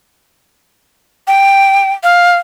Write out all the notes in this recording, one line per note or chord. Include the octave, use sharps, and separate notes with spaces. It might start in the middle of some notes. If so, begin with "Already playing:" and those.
G5
F5